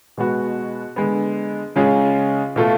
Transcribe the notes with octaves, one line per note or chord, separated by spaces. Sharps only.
B2 G#3 B3 F#4
D3 G#3 B3
C#3 G#3 C#4 F4 G#4
B2 A3 F4 A4